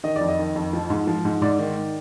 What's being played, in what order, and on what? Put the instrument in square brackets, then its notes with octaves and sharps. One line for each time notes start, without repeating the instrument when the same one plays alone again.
[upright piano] D#3 D#5
F2 D5
D#5
D#3
F2
F3
G#2
F3
G#2
G#2 D5
D#3